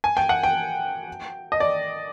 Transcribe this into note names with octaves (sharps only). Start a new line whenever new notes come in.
G#5
G5
F#5
G5
D#5
D5